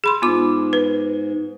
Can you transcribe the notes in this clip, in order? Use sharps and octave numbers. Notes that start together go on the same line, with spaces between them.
G#4 B5 C6
G#2 B3 F4 D6
B4